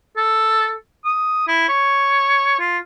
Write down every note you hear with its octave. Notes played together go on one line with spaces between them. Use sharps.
A4
D#6
E4
C#5
F4